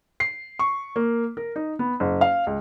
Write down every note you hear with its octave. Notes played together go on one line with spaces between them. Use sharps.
C7
C#6
A#3
A#4
D#4
B3
F#1
F5
C#2